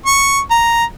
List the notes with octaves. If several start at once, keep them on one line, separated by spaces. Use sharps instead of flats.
C#6
A#5